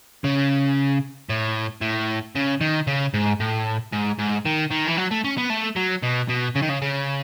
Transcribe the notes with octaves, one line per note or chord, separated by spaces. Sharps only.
C#3
A2
A2
C#3
D#3
C#3
G#2
A2
G#2
G#2
D#3
D#3
E3
F#3
A3
C#4
B3
A3
F#3
B2
B2
C#3
D#3
C#3
C#3